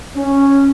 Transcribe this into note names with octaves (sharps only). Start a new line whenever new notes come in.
C#4